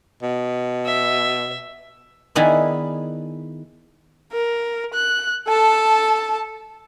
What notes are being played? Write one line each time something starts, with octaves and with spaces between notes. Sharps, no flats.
B2
E5
D#3 B3 E4 G#4 B4 D5
A#4
F#6
A4 A5